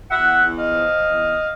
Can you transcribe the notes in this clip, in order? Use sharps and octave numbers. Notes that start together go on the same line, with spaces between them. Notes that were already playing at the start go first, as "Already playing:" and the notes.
E2 E5 F#5
E2
D#5 F5
F3
E2